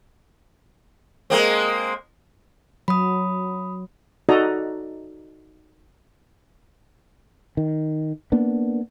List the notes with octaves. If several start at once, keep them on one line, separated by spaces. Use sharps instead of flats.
G#3 A#3 C4
F#3 B5 D#6
D#4 F#4 A4 D5 D#5 A#5
D#3
A#3 B3 D4